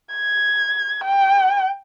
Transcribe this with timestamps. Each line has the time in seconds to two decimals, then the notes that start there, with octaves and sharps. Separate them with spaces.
0.15 G#6
1.04 G5